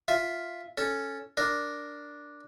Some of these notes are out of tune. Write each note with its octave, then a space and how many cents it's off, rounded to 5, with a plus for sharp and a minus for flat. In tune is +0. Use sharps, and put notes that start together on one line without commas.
F4 +0 E5 +0
C#4 +0 A4 +0
D4 +0 A#4 +0